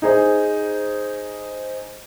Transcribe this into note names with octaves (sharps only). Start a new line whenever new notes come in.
D#4 G#4 C5